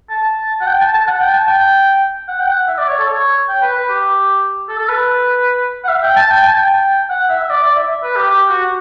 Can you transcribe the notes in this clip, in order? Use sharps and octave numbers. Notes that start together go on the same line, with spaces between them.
A5
F#5
G5
A5
A5
F#5
G5
A5
G5
F#5
G5
F#5
E5
D5
C#5
A4
C#5
G5
B4
B4
G4
A4
A4
B4
F#5
E5
G5
A5
G5
A5
G5
F#5
E5
E5
D5
D5
E5
B4
G4
G4
F#4